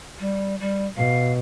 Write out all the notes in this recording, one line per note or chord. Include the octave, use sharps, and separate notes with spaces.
G3
G3
B2 F5